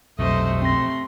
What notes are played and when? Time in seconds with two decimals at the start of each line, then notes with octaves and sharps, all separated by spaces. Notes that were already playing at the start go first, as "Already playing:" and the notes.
0.19 B1 F2 C3 F#3 A3 C5 D#5
0.62 C4 C6 A#6